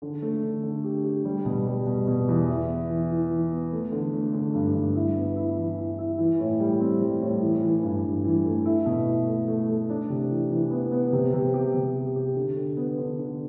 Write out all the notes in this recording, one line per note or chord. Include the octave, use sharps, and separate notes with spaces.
D3
A3
D3
D3
G4
G4
G3
B2
G3
B2
B2
E2
E4
B3
E3
E3
E3
B3
A3
D3
A3
D3
G2
G2
E4
B3
E4
E3
E4
E4
E3
A2
G3
C4
G3
A2
E3
E3
G2
G2
E3
A3
E4
B2
E4
A3
A3
A3
D4
C3
E3
E3
B3
B3
C3
C3
G4
C3
G4
G4
D3
D3
B3
D3
D3